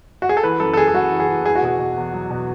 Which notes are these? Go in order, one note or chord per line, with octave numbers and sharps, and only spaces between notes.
F#4
G#4
A4
E3 B4
F#2 A4
A4
E3 G#4
G#4
F#2 F#4
E3
G#4
E3
E2 G#4
F#4
B2 G#4
B2
E2
F#3
B2